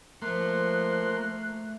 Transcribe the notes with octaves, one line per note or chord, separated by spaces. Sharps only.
F3 A3 A#3 C6 F#6